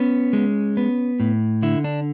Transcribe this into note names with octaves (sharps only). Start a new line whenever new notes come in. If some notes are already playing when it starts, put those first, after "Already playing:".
Already playing: B3 C#4
G#3
B3
A2
D3 E4
D4